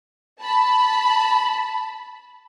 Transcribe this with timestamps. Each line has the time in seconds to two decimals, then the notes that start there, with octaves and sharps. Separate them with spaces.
0.41 A5 B5